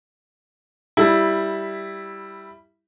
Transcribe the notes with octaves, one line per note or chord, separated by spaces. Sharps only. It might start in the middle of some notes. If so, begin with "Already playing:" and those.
G3 E4